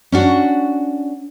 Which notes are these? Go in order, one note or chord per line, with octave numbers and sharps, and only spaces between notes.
C#4 D4 F#4